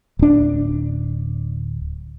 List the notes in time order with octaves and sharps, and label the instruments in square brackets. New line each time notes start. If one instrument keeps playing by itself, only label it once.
[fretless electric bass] D1 D4